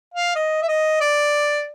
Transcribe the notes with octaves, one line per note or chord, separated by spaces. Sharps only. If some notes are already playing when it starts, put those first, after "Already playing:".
F5
D#5
E5
D#5
D5